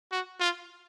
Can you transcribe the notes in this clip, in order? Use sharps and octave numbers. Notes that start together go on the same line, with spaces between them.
F#4
F4